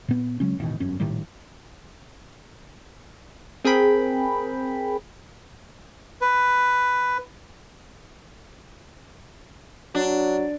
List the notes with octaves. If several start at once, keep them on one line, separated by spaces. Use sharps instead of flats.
A#2 B3
C#3 F#3 G#3 C#4
E1 A1 B2 D#3
G1 F#2 C#4
A#1 A2 D#3 G3
C4 G#4 A#4 G5 B5
B4
F#3 D4